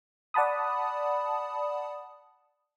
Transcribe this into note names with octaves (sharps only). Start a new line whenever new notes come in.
D5 F#5 A5 B5 D#6